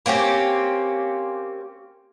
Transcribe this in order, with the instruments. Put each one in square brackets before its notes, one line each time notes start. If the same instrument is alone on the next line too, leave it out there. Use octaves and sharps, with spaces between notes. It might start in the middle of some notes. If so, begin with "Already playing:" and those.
[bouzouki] A#3 C4 C#4 G4